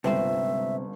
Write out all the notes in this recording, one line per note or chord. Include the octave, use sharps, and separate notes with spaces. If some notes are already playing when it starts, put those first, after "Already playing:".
G1 C#2 C3 C4 C5 E5